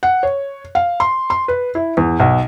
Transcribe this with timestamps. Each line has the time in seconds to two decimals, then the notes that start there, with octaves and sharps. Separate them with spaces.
0.03 F#5
0.23 C#5
0.75 F5
1.00 C6
1.30 C6
1.48 B4
1.75 E4
1.97 E2
2.20 B1